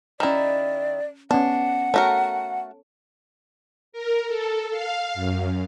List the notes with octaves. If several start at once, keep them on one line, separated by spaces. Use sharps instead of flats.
D#3 C#4 E4 D5 A#5
B3 C#4 D4 F#5
A3 F#4 A4 A#4 C#5
A#4
A4
F5
F#2